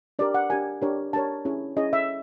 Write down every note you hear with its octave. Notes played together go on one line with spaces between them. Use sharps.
D4 G4 A#4 D5
F#5
D4 G4 A#4 G#5
D4 G4 A#4 C#5
D4 G4 A#4 C#5 A5
C#4 E4 G#4 C#5
C#4 E4 G#4 C#5 D#5
E5